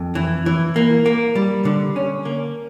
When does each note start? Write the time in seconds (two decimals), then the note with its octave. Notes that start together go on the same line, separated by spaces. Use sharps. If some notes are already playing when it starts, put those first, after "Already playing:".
Already playing: F2
0.15 E3
0.46 E3
0.76 A#3
1.06 A#3
1.35 G3
1.65 D3
1.96 C#4
2.25 A#3